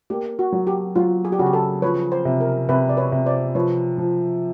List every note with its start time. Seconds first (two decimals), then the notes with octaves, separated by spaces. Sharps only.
0.10 A#3 G4
0.39 F#4
0.53 F#3
0.67 G4
0.96 F#3 F4
1.25 G#4
1.32 G4
1.39 C#3 F#4
1.46 G4
1.53 A4
1.82 F3 B4 C#5
2.12 C5
2.25 C3
2.41 A#4
2.69 C3 B4
2.89 D5
2.97 B4 C#5
3.12 C3
3.26 C5 D5
3.55 F3 B4 C#5
3.98 F3